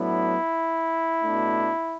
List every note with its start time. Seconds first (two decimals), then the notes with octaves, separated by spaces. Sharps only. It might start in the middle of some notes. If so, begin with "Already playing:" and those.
Already playing: A2 F#3 B3 D4 E4
1.24 B2 A3 D4